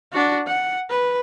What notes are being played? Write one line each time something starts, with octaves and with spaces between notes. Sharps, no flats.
D4 F#4
F#5
B4